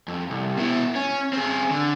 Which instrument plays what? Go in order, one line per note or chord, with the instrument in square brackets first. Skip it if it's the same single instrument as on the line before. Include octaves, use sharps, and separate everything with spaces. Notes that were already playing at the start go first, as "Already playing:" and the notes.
[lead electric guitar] F2
C2
B2 E4
C#4
C4 G#4
D3